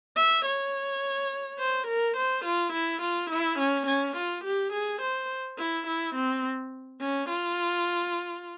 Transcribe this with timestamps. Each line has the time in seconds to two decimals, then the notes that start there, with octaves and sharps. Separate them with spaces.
0.16 E5
0.46 C#5
1.59 C5
1.87 A#4
2.17 C5
2.45 F4
2.73 E4
3.02 F4
3.30 E4
3.59 C#4
3.87 C#4
4.17 F4
4.44 G4
4.73 G#4
5.02 C5
5.58 E4
5.87 E4
6.15 C4
7.01 C#4
7.29 F4